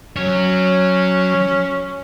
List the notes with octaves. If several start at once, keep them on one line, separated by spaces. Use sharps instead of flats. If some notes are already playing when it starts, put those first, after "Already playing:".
F#3 C#4 C#5